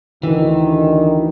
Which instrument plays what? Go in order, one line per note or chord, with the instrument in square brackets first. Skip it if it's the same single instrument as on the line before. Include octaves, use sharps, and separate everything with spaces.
[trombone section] D2 D#3 [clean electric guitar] E3